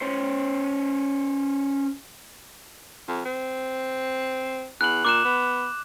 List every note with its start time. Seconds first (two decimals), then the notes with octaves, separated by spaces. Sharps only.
0.01 C#4 C5
3.08 F2
3.25 C4
4.81 E2 F#6 F#7
5.05 A#2 D6 F#6 E7
5.24 B3